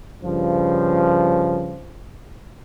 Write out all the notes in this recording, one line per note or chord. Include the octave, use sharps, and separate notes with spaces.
G2 C#3 F3